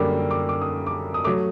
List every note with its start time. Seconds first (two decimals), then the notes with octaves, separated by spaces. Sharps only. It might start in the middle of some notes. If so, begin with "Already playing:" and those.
Already playing: F#2 D3 G3 A#3 D6
0.31 D6
0.49 D6
0.61 D#6
0.87 D6
1.14 D#6
1.24 F#3 A3 D6